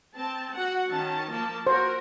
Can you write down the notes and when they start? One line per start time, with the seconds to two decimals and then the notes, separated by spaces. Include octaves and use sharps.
0.16 C4 A5
0.55 F#4 F#5
0.90 D#3 C#4 A5
1.30 F3 A#3 A5
1.67 F#4 A#4 C5